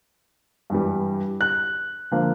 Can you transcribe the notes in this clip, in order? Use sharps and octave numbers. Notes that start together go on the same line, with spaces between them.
G2 E3 G3
F#6
D3 F3 A#3